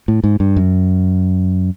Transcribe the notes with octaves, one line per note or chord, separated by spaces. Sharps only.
A2
G#2
G2
F#2